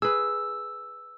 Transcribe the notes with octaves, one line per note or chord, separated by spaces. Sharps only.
G#4 B4 E6